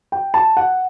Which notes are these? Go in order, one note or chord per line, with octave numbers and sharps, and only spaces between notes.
G5
A5
F#5